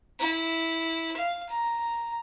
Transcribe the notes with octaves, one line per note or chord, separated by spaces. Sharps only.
E4
F5
A#5